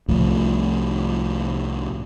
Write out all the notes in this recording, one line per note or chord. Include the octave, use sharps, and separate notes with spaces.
C2 A2 F3